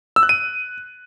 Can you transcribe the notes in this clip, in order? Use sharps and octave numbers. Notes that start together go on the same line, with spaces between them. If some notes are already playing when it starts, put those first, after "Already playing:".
E6
F#6
D#7